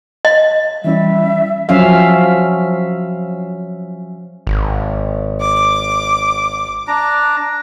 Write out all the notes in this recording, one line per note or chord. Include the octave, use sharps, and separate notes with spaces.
D#5
E3 G3 C#4 E4 E5
F3 F#3 C#4 E5 F5
G#1
D6
D4 A#5